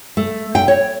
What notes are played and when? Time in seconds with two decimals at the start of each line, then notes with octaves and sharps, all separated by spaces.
0.17 A3
0.55 G5
0.68 C#5